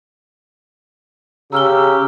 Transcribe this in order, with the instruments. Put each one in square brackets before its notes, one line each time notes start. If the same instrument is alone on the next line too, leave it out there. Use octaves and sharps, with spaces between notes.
[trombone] C#3 [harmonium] G4 [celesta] A#5 F6 G7 [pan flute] E6